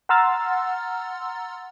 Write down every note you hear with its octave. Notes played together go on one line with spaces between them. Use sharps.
F#5 A#5 C6 E6 F6 A6